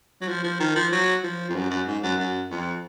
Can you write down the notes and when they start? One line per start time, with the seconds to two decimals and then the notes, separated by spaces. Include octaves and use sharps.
0.21 F#3
0.28 F3
0.44 F3
0.60 D#3
0.75 F3
0.92 F#3
1.23 F3
1.50 F2
1.55 F#2
1.70 F#2
1.87 G#2
2.03 F#2
2.19 F#2
2.51 F2